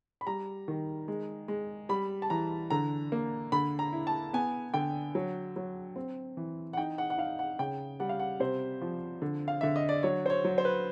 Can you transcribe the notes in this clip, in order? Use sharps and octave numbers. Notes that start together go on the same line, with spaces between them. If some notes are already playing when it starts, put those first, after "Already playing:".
B5
G3 A#5
D#3
G#3
G#3
G3 B5
A5
E3 A#5
D3 A#5
A#3
D3 B5
A#5
E4
A5
B3 G#5
D3 G5
F#3
F#3
C4
E3
F#5
D#4 G5
F#5
F#5
D#4 F5
F#5
C#3 G5
G3 F#5
F5
F#5
C3 C5
F3
D3
F5
D3 E5
D#5
D5
F#3 C#5
C5
C#5
F#3
C5
B4